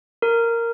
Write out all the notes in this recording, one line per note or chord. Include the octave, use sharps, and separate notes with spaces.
A#4